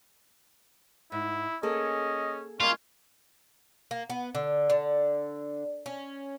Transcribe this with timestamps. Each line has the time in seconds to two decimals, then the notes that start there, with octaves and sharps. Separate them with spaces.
1.12 G#2 E4
1.63 A#3 C#4 G#4 A4 D#5
2.60 G3 G#3 A#3 C#4 F4 D#5
3.91 A#3
4.10 B3
4.35 D3
4.70 D3
5.86 C#4